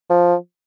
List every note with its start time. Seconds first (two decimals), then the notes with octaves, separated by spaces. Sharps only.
0.10 F3